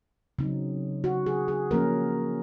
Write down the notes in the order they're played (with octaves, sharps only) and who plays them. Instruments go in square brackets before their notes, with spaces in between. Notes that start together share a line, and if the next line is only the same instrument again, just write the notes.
[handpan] C#3 F#3 C4 D#4
F#4
G#4
G#4
F3 A#3 C#4 A#4